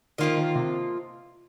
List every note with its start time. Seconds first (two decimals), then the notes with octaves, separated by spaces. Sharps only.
0.18 D#3 F3 A#3 F4 D#5
0.37 D#3
0.55 C3